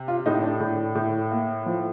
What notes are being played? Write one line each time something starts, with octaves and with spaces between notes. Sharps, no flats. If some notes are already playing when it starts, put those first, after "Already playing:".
Already playing: C3
F4
A2 D#4
D4
A2
A2
A#3
F3